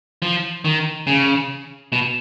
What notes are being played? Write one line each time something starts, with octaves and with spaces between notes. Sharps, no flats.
F3
D#3
C#3
B2